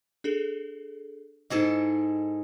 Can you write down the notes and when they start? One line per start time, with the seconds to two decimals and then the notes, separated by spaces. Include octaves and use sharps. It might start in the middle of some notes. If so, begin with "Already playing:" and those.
0.24 D4 G#4 A4
1.50 G#2 D#4 E4 G#4 A4 D#5